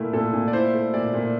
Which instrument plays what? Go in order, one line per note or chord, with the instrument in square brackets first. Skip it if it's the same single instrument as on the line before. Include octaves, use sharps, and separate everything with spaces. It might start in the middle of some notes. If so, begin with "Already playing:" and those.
Already playing: [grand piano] A#2 A3 E4 A#4
A#2 A4
A#2
D5
E4 C5
A3
A#2 D5
A#2